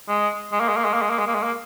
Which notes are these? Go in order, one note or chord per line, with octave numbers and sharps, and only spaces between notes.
G#3
G#3
A#3
G#3
A#3
G#3
A#3
G#3
A#3
G#3
A#3
G#3
A#3